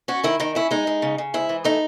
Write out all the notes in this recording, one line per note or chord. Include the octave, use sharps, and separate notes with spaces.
C#4 F#4
D#3 E4
D#3 D#4
C#4 E4
G#3 D#4
G#3
C#3
C#3
G#2 E4
E3
A3 D#4